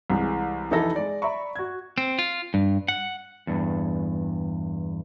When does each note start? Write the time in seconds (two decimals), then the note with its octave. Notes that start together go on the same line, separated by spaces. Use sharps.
0.10 C2 E3 G#3
0.71 F1 E3 D#4 E4 A4 A#6
0.96 G#3 D5
1.22 D5 E5 A#5 B5 C#6
1.56 F#4 G#6
1.98 C4
2.19 F4
2.54 G2
2.88 F#5
3.47 E2 G2